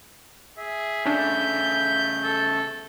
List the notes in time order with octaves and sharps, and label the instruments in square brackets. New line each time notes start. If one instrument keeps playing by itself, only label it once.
[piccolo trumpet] G#4 [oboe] E5
[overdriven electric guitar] C#3 A3 [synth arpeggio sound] C#4 D4 [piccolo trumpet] G6
[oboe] A4